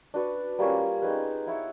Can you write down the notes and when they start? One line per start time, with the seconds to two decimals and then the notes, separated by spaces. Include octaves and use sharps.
0.14 D4 F#4 B4
0.59 G3 A#3 C#4 F4
1.02 C4 D#4 G#4 B4
1.47 B3 E4 A4 C#5